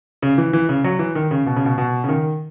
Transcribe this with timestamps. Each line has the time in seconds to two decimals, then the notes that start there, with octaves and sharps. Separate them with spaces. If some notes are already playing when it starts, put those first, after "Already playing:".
0.23 C#3
0.38 E3
0.53 E3
0.69 C#3
0.84 F#3
0.99 E3
1.15 D#3
1.31 C#3
1.46 B2
1.56 C#3
1.65 B2
1.78 B2
2.04 C#3
2.08 D#3